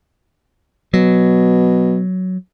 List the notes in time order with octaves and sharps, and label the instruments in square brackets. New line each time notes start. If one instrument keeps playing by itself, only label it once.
[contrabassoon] B2 [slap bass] F#3